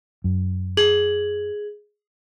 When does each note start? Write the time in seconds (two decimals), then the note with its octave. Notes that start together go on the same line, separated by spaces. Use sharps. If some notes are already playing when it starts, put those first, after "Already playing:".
0.24 F#2
0.77 G#4 G#6 F#7